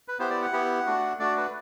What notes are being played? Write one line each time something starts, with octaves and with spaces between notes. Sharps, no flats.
B4
B3 E4 G4 C5
D5
F#5
B3 E4 G4
A3 D4 F#4
A3 D4 F#4 D5
B4